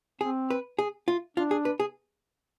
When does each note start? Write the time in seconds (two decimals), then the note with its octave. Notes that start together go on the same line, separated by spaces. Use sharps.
0.21 C4 G#4
0.50 B4
0.79 G#4
1.08 F4
1.37 D4 F4
1.51 G#4
1.65 B4
1.80 G#4